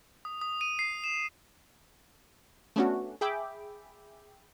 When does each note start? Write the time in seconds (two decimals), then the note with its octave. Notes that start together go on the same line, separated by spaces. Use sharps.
0.25 D#6
0.41 D#6
0.61 D#7
0.79 C7
1.04 E7
2.76 A3 B3 C#4 D4 F#4
3.21 G#4 E5 G5 B5 D6